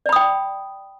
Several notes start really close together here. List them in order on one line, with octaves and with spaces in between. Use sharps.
D5 B5 D#6 G5